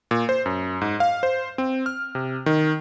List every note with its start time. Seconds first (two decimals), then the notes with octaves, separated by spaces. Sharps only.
0.11 A#2
0.29 C5
0.46 F#2
0.81 G#2
1.00 F5
1.23 C5
1.58 C4
1.86 F6
2.15 C3
2.46 D#3